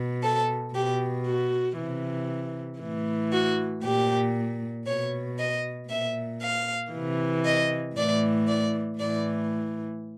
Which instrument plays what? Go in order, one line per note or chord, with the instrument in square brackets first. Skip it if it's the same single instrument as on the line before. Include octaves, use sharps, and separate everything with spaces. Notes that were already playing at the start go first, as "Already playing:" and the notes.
Already playing: [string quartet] B2
A4
B2 G4
F#4
C3 E3
A2 E3
F#4
A#2 G4
B2 C#5
D#5
A#2 E5
F5
C3 E3
D#5
A2 E3 D5
D5
A2 E3 D5